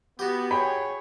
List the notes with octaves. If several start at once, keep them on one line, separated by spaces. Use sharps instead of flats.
B3 F#4 G4
G#4 C#5 G5 B5